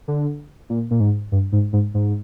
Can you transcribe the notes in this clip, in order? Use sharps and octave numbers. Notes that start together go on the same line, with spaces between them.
D3
A#2
A#2
G#2
G2
G#2
G#2
G#2